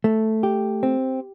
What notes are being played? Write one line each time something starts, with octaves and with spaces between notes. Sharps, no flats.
A3
G4
C4